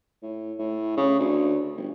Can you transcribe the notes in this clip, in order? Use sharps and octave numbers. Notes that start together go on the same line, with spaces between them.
A2
A2
C#3
D2
G1